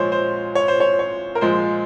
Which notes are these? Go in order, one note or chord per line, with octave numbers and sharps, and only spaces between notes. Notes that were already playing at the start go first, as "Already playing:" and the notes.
Already playing: A#2 F3 G#3 C5 C#5
C5
C#5
C5
C#5
C#5
A#4
A#2 F3 G#3 C5